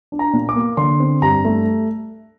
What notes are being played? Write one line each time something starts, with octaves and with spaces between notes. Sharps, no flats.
D4
A#5
A#2
D6
A#3
D3 C6
C4
G2 A#5
A3